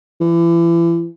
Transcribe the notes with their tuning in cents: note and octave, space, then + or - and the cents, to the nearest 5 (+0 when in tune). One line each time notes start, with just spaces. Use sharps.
E3 +35